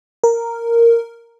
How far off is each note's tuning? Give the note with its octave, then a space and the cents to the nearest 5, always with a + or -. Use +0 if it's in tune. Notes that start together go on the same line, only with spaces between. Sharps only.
A#4 -5